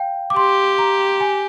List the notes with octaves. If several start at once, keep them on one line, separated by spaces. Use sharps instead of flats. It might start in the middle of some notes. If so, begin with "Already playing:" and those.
Already playing: F5 G5
D6
G4 C6
A#5
G#5